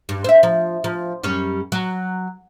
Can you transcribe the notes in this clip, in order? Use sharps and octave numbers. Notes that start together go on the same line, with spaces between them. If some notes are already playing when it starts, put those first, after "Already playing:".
G2
C5 E5
F3
F3
F#2 G3 C#4
F#3